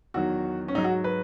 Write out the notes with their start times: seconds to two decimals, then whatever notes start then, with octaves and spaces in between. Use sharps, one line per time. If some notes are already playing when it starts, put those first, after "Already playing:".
0.14 E2 D#3 F#3 F#4
0.68 C#4
0.75 G#2 D#4
0.78 F#3
0.84 F#4
1.04 B4